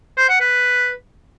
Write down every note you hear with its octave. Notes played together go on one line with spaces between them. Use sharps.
C5
F#5
B4